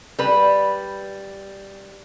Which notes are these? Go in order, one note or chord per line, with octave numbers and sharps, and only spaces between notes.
G3 B4